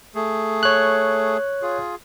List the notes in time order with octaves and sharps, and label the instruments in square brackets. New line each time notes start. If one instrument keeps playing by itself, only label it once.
[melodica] A3 G#4
[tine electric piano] C#5 F#6
[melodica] F4 G#4